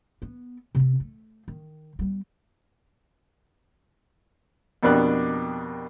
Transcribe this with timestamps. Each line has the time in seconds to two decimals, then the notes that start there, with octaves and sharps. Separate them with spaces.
0.22 B3
0.75 C3 C4
1.00 A3
1.48 D#3
1.99 G3 B3
4.83 F2 B2 A#3 D4 G4 F#6